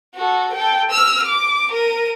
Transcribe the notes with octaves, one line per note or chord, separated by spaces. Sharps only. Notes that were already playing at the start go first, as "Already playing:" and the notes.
F#4 A4
A4 G5
E6 F6
D6
A#4 D#7